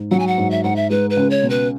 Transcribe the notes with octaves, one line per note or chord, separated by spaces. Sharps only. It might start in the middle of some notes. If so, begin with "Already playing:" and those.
Already playing: G#2
F#3 F#5
G#5
F#5
G#2
E5
G#2 F#5
E5
G#3 B4
B4
C#2
C#5
B2
B4